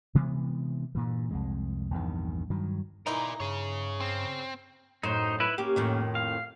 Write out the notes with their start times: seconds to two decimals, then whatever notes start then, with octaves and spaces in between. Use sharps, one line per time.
0.15 C3 E3 G#3 B3
0.95 G2 A#2 E3
1.31 C2 F2 G#3
1.91 A#1 E2 G2 D#3
2.50 G2 D#3 F#3
3.07 E3 G#3 D#4 A#4 D5
3.40 G2 G#4 C#5
4.00 C4
5.03 F#2 A2 D#4 C5
5.40 E4 B4
5.58 A#3 C#4 G4
5.76 F2 A2 D#3
6.15 F5